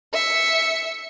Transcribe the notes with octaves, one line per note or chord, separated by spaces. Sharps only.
E5 C#7